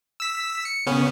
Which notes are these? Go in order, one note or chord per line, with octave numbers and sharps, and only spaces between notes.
E6 B6
C#7
C#3 B3 C#4